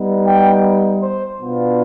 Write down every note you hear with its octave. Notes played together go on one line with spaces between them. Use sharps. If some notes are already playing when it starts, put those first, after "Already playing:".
Already playing: G3 B3 D#4
G5
C5
B2 B3 D4 F4